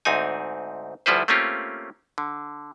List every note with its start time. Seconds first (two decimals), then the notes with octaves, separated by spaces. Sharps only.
0.05 D2 G#2 C4 D#4 G#5
1.06 D2 F3 G3 E4 B4 C5
1.28 A3 A#3 C4 C#4 F4 G4
2.18 D3